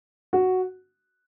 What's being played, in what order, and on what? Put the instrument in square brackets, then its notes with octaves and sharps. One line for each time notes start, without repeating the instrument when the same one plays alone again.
[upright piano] F#4